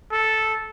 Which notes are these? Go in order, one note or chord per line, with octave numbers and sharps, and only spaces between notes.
A4